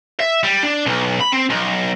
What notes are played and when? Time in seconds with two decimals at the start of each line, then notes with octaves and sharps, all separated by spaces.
0.20 E5
0.43 G3
0.63 D4
0.86 B1
1.21 B5
1.32 C4
1.50 B1